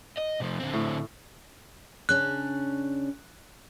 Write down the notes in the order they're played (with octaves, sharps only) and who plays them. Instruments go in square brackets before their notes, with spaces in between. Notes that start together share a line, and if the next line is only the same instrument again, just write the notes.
[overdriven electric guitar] D#5
C3 F3
D3 C4
[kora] A2
[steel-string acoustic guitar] C#3 C#4 D4 [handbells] F#6